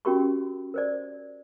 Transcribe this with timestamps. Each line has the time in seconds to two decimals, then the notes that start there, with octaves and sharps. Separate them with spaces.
0.05 C#4 F#4 G4 A#4 B5 C#6
0.74 A#4 C5 D5